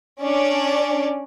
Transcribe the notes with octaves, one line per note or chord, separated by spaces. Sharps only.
C#4 D4 D5